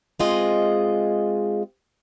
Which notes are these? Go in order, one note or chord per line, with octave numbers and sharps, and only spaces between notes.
G#3 C4 F4 G#4 D#5